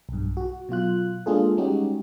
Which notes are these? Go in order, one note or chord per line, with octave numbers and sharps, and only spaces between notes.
B1 G2
F#4
B2 F#3 F4 F#6
G#3 A#3 D4 F4 G#4 A4
G3 G#3 C#4 D#4 F#4 G4